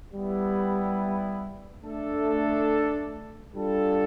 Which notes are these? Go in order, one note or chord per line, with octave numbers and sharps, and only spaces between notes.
G3 B3 E4
A3 D4 A4
G3 D4 F4 A4